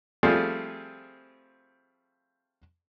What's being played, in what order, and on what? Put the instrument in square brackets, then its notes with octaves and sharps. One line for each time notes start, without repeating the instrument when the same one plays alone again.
[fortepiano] F3 G3 A3 C4 F4 G#4